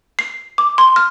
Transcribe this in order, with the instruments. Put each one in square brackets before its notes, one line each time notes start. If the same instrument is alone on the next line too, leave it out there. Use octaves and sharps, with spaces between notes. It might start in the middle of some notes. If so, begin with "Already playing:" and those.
[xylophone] C7
D6
C6
F6